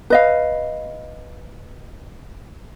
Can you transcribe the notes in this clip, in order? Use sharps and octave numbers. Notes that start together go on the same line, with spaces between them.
B4 D#5 F5